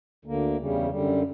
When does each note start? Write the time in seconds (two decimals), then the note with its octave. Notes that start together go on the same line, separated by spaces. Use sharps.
0.25 D2 D3 A#3
0.57 E2 C#3 G3
0.91 F#2 D3 G3